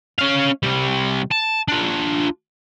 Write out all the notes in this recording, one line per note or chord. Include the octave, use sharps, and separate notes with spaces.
C#4 F5
C3 G3
A5
D4 F4